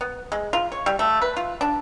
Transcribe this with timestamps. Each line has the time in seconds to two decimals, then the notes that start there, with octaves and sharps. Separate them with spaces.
0.01 B3
0.32 G#3
0.53 F4
0.72 C#5
0.86 G3
0.99 A3
1.22 B4
1.37 F4
1.61 D4